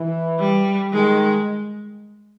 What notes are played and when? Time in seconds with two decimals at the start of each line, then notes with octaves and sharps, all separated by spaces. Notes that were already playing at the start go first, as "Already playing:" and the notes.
Already playing: E3
0.39 G3
0.92 D#3 G#3